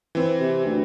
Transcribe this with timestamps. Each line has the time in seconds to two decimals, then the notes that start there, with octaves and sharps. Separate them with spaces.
0.15 E3 C4
0.40 C3
0.66 D2